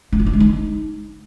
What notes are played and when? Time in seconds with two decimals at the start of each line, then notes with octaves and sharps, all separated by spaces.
0.12 D4
0.19 F4
0.26 D4
0.33 G#3
0.40 D#4